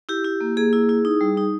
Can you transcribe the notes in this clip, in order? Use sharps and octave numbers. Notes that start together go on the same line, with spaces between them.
E4 G4
E4
A#3
A#3 G#4
E4
E4
D#4
G3
D#4